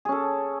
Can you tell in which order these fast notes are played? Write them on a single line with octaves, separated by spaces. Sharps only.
G#4 C#4 A4